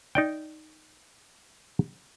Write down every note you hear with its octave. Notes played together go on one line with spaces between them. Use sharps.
D#4 D5 G5